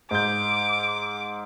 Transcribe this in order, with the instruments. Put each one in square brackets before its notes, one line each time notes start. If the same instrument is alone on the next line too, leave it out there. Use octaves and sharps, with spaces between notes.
[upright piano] G#2 G6 [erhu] D6